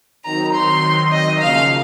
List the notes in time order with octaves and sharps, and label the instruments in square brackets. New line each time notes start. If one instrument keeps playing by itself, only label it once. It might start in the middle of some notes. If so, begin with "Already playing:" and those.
[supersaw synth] D#3 F#3 C4 D#4 [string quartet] A#5
[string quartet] C6
D#5
[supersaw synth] C#3 F3 A#3 [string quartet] F5